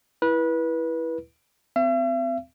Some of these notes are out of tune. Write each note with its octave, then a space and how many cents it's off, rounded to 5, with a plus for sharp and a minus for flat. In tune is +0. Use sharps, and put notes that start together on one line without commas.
E4 +0 B4 -25
C4 -35 E5 +45